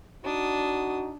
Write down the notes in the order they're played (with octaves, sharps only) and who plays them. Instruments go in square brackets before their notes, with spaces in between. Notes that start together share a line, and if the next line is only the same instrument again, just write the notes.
[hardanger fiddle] D4 D#6 [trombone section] D#4 F#4